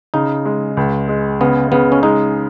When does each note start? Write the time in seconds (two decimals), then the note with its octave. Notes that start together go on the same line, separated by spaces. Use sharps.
0.14 C#3 D#4
0.45 G#3
0.77 C#2
1.08 G#3
1.40 C#3 B3
1.72 C#3 B3
1.92 C#4
2.03 G#3 D#4